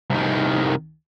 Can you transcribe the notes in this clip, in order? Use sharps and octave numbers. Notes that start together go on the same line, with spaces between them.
C2 D#3